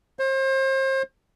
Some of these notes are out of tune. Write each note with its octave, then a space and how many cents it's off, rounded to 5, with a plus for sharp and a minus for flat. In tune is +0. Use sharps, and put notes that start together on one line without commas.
C5 +35